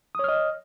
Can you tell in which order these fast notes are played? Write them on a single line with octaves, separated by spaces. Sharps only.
D#6 C#5 F6 D#5